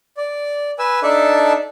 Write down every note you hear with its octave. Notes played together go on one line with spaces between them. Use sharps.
D5
B4 G#5 E6
D4 D#4 A4 D5 E5 A5